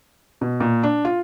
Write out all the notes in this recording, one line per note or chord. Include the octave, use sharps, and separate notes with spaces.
B2
A#2
D4
F4